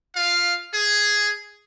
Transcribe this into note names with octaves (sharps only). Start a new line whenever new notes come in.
F4 F5
G#4